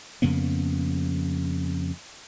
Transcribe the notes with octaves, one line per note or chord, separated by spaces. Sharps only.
F2 C#3 A#3 B3